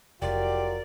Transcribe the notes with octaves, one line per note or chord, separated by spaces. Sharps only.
F1 F#3 F4 G4 A#4 D5